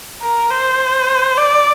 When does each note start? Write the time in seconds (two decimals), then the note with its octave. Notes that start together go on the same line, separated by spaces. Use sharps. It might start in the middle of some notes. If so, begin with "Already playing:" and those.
0.22 A#4
0.51 C5
1.38 D5